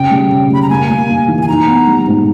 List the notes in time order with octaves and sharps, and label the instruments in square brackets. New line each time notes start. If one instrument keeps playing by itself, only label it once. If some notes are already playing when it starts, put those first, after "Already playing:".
Already playing: [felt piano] C#3 [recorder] G5
[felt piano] G3
C#3
[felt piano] G3 [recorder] B5
[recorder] A#5
[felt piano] A#3 [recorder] G#5
[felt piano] A#3
A#3
E3
[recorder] G#5
[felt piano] D#4 [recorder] A#5
[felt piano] B3
G3
G#2